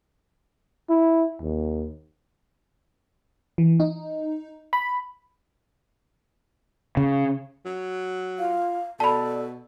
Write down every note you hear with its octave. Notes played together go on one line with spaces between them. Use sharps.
E4
D#2
E3
D#4
B5
C#3
F#3
F4 F5
B2 A4 D5 A5 B5